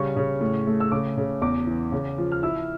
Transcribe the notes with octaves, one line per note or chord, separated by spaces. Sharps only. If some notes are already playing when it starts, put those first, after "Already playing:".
Already playing: C#3 G3 C#6
C#3
A2
A3
E6
C#3 D6
C#3
E2 D6
E3
C#3
F3
F6
E4 E6